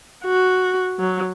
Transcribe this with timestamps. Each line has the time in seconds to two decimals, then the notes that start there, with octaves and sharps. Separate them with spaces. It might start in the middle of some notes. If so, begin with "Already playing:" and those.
0.24 F#4
0.99 F#3